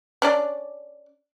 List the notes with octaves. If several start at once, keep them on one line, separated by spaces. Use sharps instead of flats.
C#4 D4 D5